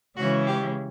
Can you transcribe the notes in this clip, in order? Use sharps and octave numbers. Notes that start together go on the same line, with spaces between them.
C#3 E3 G#3 C#4 F#4
G4